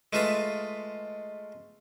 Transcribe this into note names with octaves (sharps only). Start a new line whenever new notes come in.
G#3 A3 F4 B4 E5 F5